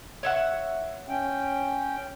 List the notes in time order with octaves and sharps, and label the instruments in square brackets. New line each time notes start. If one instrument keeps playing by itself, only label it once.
[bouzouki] C#5 E5 F#5
[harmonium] C#4 G5